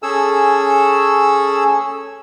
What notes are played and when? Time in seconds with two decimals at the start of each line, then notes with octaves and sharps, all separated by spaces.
0.03 C#4 G#4 A4 E6